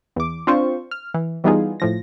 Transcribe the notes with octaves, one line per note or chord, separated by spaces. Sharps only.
E2 D6
C4 D4 F4 C5 C#6
F6
E3
E3 G3 B3 D#4 F4 G#4
A2 F3 A#6